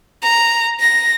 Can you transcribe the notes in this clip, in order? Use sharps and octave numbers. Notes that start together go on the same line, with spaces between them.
A#5
A#6